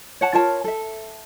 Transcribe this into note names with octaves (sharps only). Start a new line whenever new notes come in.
C#5 F#5 A5
F4 A#4 C#5 A5
A4 E5